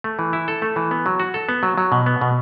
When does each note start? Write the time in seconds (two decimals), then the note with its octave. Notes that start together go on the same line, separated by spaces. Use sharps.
0.04 A3
0.19 E3
0.33 E4
0.48 A4
0.62 A3
0.76 E3
0.91 B3
1.06 F#3
1.20 F#4
1.34 A4
1.49 B3
1.63 F#3
1.78 F#3
1.92 B2
2.06 B3
2.21 B2